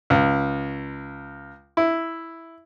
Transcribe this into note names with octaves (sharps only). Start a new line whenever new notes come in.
C#2
E4